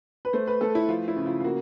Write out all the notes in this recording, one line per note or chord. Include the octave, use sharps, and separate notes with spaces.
B4
A3 C5
B4
A3 A4
E4
F3 F4
E4
C#3
F4
F4
A#3 F#4